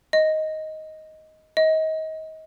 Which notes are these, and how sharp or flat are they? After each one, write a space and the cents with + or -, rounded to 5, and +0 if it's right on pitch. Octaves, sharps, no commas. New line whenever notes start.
D#5 +10
D#5 +30